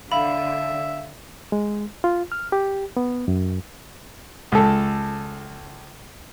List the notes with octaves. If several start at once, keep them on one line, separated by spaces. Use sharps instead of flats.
D3 E5 F5 B5
G#3
F4
F6
G4
B3
F#2
C#2 A4